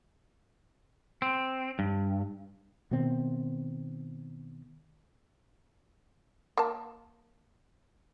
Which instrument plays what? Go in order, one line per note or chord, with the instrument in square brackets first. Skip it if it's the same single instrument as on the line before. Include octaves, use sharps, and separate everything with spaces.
[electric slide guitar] C4
G2
[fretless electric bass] B2 D#3 B3 C4
[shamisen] A#3 A5